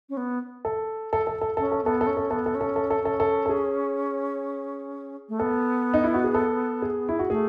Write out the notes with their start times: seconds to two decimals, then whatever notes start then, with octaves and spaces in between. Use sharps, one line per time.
0.09 C#4
0.17 B3
0.65 A4
1.13 A4
1.27 A4
1.41 A4
1.57 C#4 A4
1.72 A4
1.84 B3 A4
2.01 A4
2.07 C#4
2.17 A4
2.31 B3 A4
2.46 A4
2.55 C#4
2.61 A4
2.76 A4
2.90 A4
3.02 C#4 A4
3.20 A4
3.46 A4
3.49 G#4
5.29 A3
5.39 B3 A4
5.94 D#4
6.04 E4
6.14 F#4
6.24 G#4
6.35 A4
6.82 G#4
7.09 E4
7.19 F#4
7.30 A3 G#4